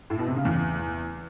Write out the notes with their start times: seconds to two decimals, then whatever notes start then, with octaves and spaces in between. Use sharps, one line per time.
0.10 A2
0.19 B2
0.28 C3
0.36 C#3
0.45 E2